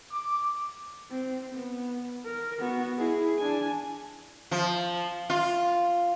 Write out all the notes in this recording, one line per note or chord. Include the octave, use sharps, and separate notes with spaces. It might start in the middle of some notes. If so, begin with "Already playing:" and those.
D6
C4
B3
A#4
B3 F#4
E4 G#4
D4 G#5
F3
F4